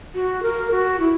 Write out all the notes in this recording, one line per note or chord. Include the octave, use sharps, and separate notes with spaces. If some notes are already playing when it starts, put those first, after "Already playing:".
F#4
A#4
F#4
E4